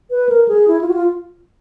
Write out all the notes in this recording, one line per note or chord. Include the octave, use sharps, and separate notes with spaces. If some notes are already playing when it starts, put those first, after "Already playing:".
B4
A#4
G#4
E4
F4
F#4
F4